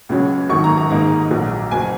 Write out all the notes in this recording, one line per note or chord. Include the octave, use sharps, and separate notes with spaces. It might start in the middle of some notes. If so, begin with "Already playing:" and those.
C#2 C#3 F#3 C#4
G#1 F#2 D#3 C#6
A#5
A#5
G#2 D#3 A#3 D#4 A#5
A#1 A#2 F#3
F#1 F#3 G#5